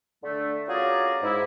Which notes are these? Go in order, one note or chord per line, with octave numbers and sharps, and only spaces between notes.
D3 A3
C#4 F4 F#4 G#4 A#4 D5
G#2 E4